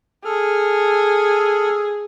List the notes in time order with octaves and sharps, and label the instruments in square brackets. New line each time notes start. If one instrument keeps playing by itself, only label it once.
[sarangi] G#4 [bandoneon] A4 F6